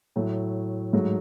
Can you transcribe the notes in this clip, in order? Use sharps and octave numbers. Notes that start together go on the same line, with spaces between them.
A2 F#3 A3
G#2 F#3 A3